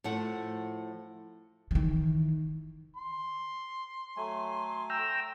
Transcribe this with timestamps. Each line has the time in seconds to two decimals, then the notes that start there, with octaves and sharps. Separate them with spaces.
0.04 A2 F3 A3 F#5
1.71 D#3 E3
2.96 C6
4.17 F#3 A3 G#5
4.90 G5 A#5 E6